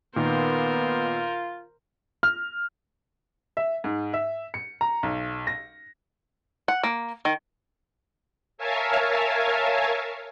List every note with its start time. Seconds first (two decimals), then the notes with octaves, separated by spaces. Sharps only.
0.16 A#2 D#3 B3 F4 A#4 C5
2.23 F6
3.57 E5
3.84 G#2
4.14 E5
4.54 C#7
4.81 A#5
5.03 B1
5.47 A#6
6.68 F#5
6.83 A#3
7.25 D#3
8.58 A#4 C#5 E5 F5 G#5 A5